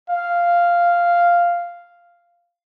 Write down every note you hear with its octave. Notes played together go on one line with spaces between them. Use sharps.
F5